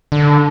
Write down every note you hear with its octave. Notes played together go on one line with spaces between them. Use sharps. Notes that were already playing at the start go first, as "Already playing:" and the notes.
D3